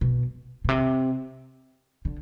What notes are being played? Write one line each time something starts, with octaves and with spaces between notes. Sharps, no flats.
B2
B2
C3
D3